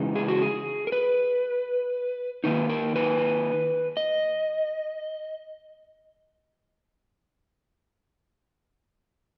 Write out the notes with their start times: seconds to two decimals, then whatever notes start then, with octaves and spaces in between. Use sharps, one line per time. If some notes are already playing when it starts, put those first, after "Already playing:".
Already playing: C#3 E3 G#3 D#4
0.15 G#4
0.28 F#4
0.42 G#4
0.87 A#4
0.92 B4
2.44 D#3 A#3 D#4 B4
2.69 A#4
2.96 B4
3.97 D#5